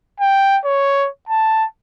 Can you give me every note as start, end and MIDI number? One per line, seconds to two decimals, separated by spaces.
0.20 0.58 79
0.65 1.08 73
1.29 1.65 81